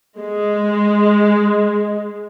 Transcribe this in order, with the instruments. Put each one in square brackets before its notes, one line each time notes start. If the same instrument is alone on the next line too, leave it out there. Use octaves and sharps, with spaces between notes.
[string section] G#3